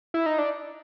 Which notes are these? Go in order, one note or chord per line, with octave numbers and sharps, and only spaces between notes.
E4
D#4
D4